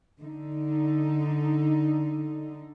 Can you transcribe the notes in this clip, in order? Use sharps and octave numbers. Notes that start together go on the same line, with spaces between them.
D3 D#4